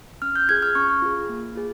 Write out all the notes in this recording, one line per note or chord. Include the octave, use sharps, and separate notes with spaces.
C#4 F6
G6
F4 G#4 G#6
F6
C#4 C#6
F4 G#4
A#3
F4 G#4